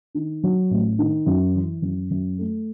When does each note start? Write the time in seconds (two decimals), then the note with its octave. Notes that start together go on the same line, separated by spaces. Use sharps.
0.15 D#3
0.43 F#3
0.71 A1
0.99 D#3
1.26 F#2
1.55 E3
1.82 F#2
2.11 F#2
2.38 A3